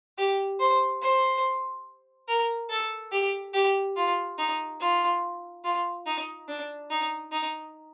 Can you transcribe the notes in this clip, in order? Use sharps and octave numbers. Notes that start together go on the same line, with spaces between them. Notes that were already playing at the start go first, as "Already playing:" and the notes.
G4
C5
C5
A#4
A4
G4
G4
F4
D#4
F4
F4
D#4
D4
D#4
D#4